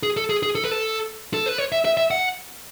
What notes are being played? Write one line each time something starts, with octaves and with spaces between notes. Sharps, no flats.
G#4
A4
G#4
G#4
A4
B4
A4
A4
B4
C#5
E5
E5
E5
F#5